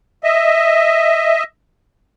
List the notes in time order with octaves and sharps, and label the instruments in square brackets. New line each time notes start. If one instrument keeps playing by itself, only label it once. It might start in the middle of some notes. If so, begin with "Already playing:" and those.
[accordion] D#5 E5